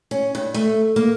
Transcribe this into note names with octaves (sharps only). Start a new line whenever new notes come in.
C#4
G2
A3
A#3